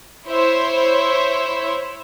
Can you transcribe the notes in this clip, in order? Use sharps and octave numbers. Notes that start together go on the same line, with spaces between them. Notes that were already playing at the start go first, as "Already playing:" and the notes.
E4 C5 C#5 E5